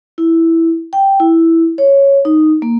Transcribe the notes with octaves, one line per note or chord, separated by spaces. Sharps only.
E4
G5
E4
C#5
D#4
A#3